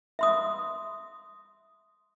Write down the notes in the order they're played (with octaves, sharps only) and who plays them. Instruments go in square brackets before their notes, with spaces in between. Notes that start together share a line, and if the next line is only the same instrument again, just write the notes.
[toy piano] E5 C6 D#6